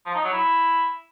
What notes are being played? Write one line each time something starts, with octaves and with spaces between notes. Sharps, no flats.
F3
D#4
F#3
E4